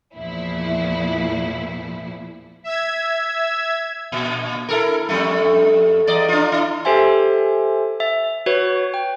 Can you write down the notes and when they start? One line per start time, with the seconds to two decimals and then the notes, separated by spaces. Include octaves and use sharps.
0.16 E2 A#2 F3 E4
2.64 E5 E6 G#6
4.12 A#2
4.69 E4 A4 A#4
5.09 F2 G3 A3
6.07 E2 D5 D#5
6.28 D4 F4
6.52 E4
6.85 G4 A4 C5 E5 G#5 C6
8.00 E5 A6
8.46 F#4 B4 C#5
8.94 G5